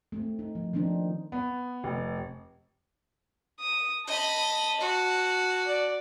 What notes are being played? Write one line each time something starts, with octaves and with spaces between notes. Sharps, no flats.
A3 C4
D#4
F3
D#3 F3 C4 D4 D#4
B3
F1
D#6
D#5 A5 B5
F#4
D5